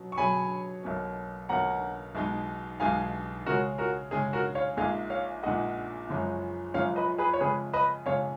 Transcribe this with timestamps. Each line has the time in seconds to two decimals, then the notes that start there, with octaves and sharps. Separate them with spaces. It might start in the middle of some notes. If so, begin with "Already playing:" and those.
Already playing: B2 F#3 C#4
0.12 C#6
0.17 B2 F#3 C#4 G#4 C#5 G#5 B5
0.83 B1 B2 A#3 C#4
1.49 B1 B2 A#3 C#4 F#5 A#5
2.15 B1 B2 G#3 D#4
2.80 B1 B2 G#3 D#4 F5 G#5
3.46 C#3 G#3 C#4 F#4 A#4
3.78 F#4 A#4
4.11 C#3 G#3 C#4 G#4
4.33 F#4 A#4
4.55 C#5 F5
4.77 A#1 A#2 G#3 D#4 G#4 F5 G#5
5.10 C#5 F5
5.43 A#1 A#2 G#3 D#4 G#4 D#5 F#5
6.09 F#1 F#2 F3 G#3 C#4
6.74 F#1 F#2 F3 G#3 C#4 C#5 F5
6.96 B4 D#5
7.18 G#4 B4
7.34 C#5
7.40 F2 C#3 G#3 C#4 G#4 B4
7.73 B4 D#5
8.06 F2 C#3 G#3 C#4 C#5 F5